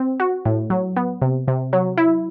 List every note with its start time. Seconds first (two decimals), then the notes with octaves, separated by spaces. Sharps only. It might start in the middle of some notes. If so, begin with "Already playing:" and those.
Already playing: C4
0.20 F#4
0.45 A2
0.70 F#3
0.97 B3
1.22 C3
1.48 C3
1.73 F#3
1.98 E4